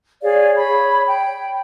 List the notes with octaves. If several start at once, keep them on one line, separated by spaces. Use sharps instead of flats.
G#4 C#5 D5 F5
C#5 B5
G5